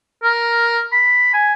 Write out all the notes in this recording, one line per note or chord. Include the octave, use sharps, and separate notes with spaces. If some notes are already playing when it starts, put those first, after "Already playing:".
A#4
B5
G#5